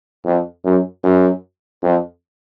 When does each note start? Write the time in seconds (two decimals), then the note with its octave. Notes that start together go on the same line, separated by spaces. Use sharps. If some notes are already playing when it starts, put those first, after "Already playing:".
0.25 F2
0.65 F#2
1.03 F#2
1.83 F2